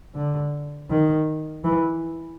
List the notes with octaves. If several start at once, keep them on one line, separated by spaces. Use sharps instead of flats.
D3
D#3
E3